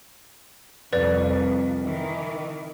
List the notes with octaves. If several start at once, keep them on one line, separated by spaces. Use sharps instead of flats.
C2 F2 B4 D5
D#3 E3